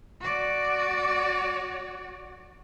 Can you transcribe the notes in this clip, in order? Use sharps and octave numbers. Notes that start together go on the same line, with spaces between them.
F#4 D5